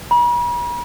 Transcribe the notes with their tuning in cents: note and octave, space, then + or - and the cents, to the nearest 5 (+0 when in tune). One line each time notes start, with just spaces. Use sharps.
B5 -45